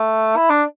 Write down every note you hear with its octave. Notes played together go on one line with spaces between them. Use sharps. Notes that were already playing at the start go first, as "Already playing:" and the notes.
Already playing: A3
E4
D4